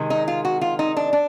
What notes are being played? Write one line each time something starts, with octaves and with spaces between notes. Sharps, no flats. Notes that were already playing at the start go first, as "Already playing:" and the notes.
Already playing: C3 D#3 G#3
D#4
F4
F#4
F4
D#4
D4
D4